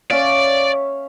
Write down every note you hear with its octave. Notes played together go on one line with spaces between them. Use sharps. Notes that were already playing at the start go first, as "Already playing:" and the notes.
C#4 D5 E5 F5